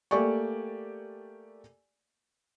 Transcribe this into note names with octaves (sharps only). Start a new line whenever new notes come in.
A3 A#3 G4 D5 G#5 C#6